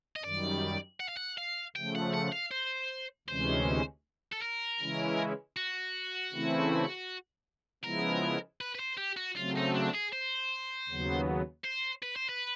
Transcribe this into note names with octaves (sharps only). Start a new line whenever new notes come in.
D#5
F#2 D#3 G3 D5
F#5
F5
F#5
F5
C#3 F3 A3 G5
F#5
F#5
F5
C5
D2 C3 E3 G#3 C#4 C5
A4
A#4
C#3 E3 G#3 C#4 E4
F#4
C#3 E3 A3 C4 E4
C#3 F3 G#3 B3 E4 A#4
B4
B4
C5
G4
F#4
C#3 F#3 A3 C4 F4
D#4
D4
G#4
C5
D#2 C#3 F#3 B3
C5
B4
C5
B4